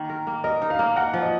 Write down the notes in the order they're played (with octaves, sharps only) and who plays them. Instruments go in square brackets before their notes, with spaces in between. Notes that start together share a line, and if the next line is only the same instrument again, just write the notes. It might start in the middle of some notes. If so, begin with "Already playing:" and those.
Already playing: [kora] D#3 A#3
A#4
A#3
[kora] A#4 [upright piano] D#5
[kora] D#4
[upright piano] F5
[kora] A#3
[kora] A#4 [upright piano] F#5
[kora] F3
[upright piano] D#5